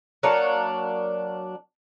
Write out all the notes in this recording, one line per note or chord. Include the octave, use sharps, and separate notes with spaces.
F#3 A#3 D4 C#5